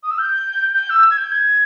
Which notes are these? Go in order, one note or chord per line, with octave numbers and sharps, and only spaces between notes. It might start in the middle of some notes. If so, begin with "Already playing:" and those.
D#6
E6
G6
G6
E6
G#6
G6
G#6